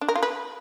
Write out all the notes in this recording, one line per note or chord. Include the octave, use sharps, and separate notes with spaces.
D4
A#4
F4
B4